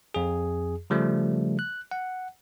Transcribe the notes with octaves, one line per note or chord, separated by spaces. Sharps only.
F2 G#4
C#3 F3 G3 A3
F#6
F#5